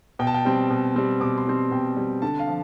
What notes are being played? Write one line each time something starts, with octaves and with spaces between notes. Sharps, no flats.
B2 G5
A5
G5
G3 C4
B2
G3 C4
B2 D6
C6
G3 C4
B2 G5
G3 C4
D3 A5
F5
F3